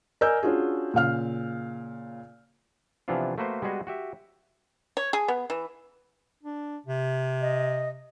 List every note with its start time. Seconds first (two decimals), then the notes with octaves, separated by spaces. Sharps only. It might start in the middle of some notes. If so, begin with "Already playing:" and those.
0.21 A#4 D5 D#5 G#5 E6 G6
0.43 C#4 D4 F4 F#4 G#4
0.94 A#2 C#3 F5 F6
3.08 C3 E3 F3 B3 D4 F4
3.38 A3 A#3 F#4 B4 C5
3.62 G3 G#3 B3 F#4 G#4 D#5
3.87 F#4 G4 E5
4.97 C#5
5.13 G#4
5.28 B3
5.50 E3
6.43 D4
6.86 C3
7.41 D#5